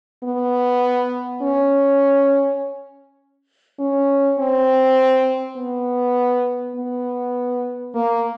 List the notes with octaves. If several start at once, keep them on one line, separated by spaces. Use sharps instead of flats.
B3
C#4
C#4
C4
B3
B3
A#3